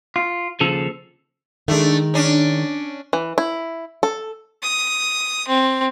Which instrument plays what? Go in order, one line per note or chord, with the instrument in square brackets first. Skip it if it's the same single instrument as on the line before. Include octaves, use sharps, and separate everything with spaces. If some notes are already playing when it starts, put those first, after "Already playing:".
[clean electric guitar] F4
D#2 C#3 F3 A4
[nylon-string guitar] D#3 G#3 [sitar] A3 D4
[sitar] C#4 D4
[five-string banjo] E3
E4
A4
[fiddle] D#6
C4